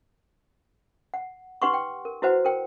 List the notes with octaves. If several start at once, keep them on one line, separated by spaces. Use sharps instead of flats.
F#5
D#4 G4 B4 F#5 C6 C#6
G5
A#4
E4 F#4 B4 C5 F#5
A#4 G5